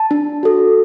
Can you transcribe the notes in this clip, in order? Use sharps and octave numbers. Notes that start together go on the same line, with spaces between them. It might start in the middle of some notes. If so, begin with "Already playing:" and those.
Already playing: A5
D4
F#4 A4